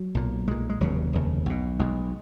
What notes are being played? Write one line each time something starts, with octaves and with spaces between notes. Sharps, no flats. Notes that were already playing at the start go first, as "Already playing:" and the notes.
Already playing: F#3
B1 A#2
B1 A#2 G#3
G#3
F1 D#2 C#3 F#3
F1 D#2 C#3
B1 B2
B1 B2 G#3